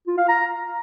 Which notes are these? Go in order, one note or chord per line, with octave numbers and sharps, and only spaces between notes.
F4
F5
A#5